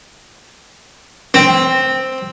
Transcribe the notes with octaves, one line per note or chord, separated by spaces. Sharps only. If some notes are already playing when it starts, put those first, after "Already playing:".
C4